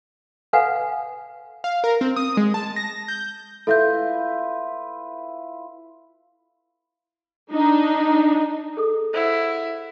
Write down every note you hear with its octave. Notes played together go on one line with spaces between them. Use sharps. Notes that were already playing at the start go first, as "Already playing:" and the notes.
A4 B4 F5 F#5 G#5
F5
A#4
C4
D#6
G#3
A5
A#6
G6
E4 F4 A4 B4 E5 G6
D4 D#4
G#4 A4 D#6
E4 C5 D#5 F#5